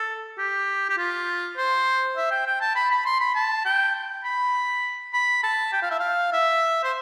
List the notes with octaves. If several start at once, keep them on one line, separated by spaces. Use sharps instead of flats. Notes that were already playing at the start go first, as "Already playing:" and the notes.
Already playing: A4
G4
G4
F4
C5
E5
G5
G5
A5
B5
B5
C6
B5
A5
G5
B5
B5
A5
G5
F5
E5
F5
E5
C5